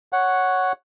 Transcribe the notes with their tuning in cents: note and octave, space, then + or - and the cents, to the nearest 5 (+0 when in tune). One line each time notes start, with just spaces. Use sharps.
C#5 +0 F#5 +0